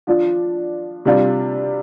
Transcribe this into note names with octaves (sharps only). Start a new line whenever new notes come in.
F3 D4 F4
C3 G3 D4 F4